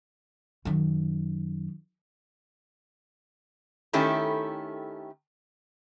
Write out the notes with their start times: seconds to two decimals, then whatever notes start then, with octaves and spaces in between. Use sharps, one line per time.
0.65 F#2 D#3
3.93 D#3 A3 C#4 E4 G4 A4